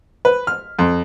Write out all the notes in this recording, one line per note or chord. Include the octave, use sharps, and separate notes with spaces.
B4
F6
F2